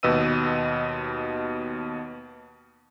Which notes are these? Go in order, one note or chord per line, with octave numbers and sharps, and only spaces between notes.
D#2 B2 B4 D#5 E6 D#7